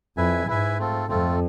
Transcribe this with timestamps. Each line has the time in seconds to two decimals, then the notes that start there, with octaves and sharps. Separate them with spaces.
0.17 F2 E4 B4 E5 G#5
0.47 G#2 E4 B4 E5 G#5
0.78 A3 C4 F4 A4
1.08 F2 A3 C4 F4 A4